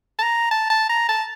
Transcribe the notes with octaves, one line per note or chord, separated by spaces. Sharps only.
A5
A#5
A5
A5
A#5
A5